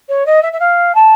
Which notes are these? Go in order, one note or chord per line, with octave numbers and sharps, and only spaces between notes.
C#5
D#5
E5
E5
F5
A5